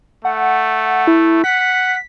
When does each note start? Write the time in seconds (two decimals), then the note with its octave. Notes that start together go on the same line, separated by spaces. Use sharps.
0.25 A3 F#5
1.07 E4
1.44 F#5 B6